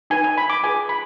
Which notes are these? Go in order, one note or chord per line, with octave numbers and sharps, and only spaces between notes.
D#4 B4 G#5
G#5
B5
D6
F4 G#4 B4 G#5
B5